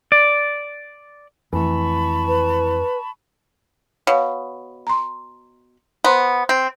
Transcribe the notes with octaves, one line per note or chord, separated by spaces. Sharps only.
D5
F2 E3 A3 A5 B5 C#6
B4
B2 C#5 F5
A#5 C6
B3 C5 A#5 C6
C4